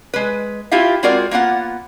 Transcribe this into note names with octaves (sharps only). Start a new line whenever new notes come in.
G#3 B4
E4 F4 G4 E5 F5
G#3 C4 F4 F#4 A#4 D5
A#3 B3 F4 F#5